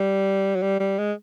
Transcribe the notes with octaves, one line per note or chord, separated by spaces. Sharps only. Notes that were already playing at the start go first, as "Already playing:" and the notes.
Already playing: G3
F#3
G3
G3
G#3